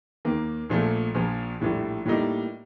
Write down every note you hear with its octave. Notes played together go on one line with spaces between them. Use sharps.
D#2 D#3 A#3
A#1 A#2 F3 A3
A#1 A#2 F3
A#1 A2 G3
A2 G3 A#3 D#4